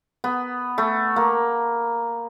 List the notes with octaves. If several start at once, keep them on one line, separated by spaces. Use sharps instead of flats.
B3
A3
A#3